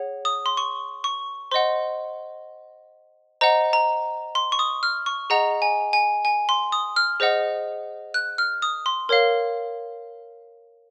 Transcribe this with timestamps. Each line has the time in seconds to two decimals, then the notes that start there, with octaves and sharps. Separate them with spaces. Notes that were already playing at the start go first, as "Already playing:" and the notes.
Already playing: G#4 C#5 F#5
0.25 D#6
0.46 C6
0.57 C#6
1.04 C#6
1.51 C5 D#5 F#5 C6
3.41 C5 D#5 F#5 A#5
3.73 A#5
4.35 C6
4.52 C#6
4.59 D#6
4.83 F6
5.06 C#6
5.30 G#4 D#5 F#5 A#5
5.62 G#5
5.93 G#5
6.25 G#5
6.49 C6
6.72 D#6
6.96 F6
7.20 G#4 C5 D#5 F#5
8.14 F#6
8.38 F6
8.62 D#6
8.86 C6
9.09 A#4 C#5 F5